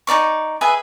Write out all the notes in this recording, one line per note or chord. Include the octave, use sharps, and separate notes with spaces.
D#4 A#4 D5 C#6
G#4 B4 E5